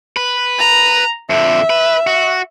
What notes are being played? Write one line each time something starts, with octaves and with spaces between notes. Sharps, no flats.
B4
A#5
F2 D3 E5
B4
F#4